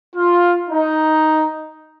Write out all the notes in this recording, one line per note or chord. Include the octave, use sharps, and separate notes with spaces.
F4
D#4